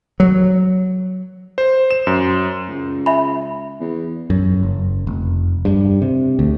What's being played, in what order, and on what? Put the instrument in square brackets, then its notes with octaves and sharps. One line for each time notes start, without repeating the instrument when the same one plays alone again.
[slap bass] F#3
[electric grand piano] C5
E7
F#2
[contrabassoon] C#2
[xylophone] E5 G#5 B5
[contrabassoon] E2
[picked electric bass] F#2
F#1
F1
G2
C3
D2